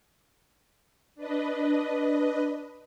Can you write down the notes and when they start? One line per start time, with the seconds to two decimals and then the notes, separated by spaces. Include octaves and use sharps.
1.15 D4 B4 D#5